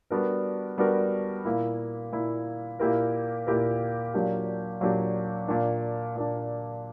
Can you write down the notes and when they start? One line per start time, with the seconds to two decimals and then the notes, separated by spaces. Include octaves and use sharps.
0.10 G3 B3 D4 F#4 A#4
0.78 G3 B3 D4 F#4 A#4
1.45 A#2 A#3 E4
2.12 A#2 A#3 E4
2.79 A#2 A#3 E4 G4 A#4
3.47 A#2 A#3 E4 G4 A#4
4.14 A#2 F#3 A#3 D4 G4
4.81 A#2 F#3 A#3 D4 G4
5.48 A#2 A#3 D4
6.16 A#2 A#3 D4